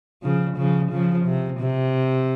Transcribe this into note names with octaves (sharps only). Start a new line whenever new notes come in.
C#3 F3
C#3 F3
C#3 F3
C3
C3